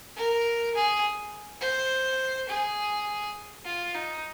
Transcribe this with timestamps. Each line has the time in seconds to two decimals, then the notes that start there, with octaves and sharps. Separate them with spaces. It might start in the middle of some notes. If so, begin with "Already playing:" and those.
0.16 A#4
0.75 G#4
1.61 C5
2.49 G#4
3.65 F4
3.95 D#4